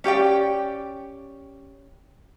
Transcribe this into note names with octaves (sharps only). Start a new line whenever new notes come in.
C#4 G4 D5 G5